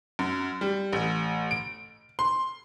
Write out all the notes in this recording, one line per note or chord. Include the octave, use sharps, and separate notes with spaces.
F#2
G3
A1
D7
C6